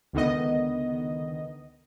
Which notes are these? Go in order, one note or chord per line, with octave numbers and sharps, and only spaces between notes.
C#2 D3 D#3 B3 D#5